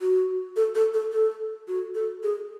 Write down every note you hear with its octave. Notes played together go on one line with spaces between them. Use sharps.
F#4
A4
A4
A4
A4
F#4
A4
G#4